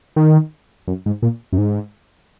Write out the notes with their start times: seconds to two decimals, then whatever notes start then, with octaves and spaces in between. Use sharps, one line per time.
0.16 D#3
0.88 F#2
1.06 G#2
1.22 A#2
1.53 F#2
1.58 G#2